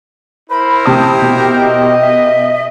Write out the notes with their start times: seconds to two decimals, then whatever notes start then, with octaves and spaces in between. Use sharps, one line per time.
0.50 E4 A#4 C5 B5
0.86 C3 G4 A5 D#6
1.22 B2
1.56 D#5
2.00 E5